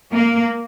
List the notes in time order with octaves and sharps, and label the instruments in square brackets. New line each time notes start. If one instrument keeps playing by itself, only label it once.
[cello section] A#3